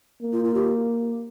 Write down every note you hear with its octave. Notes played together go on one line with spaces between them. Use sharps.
A#3
F4
F4
G4